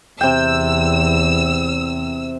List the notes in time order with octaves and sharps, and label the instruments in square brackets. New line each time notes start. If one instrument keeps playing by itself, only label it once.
[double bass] E2 [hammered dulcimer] C3 G5 [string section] E6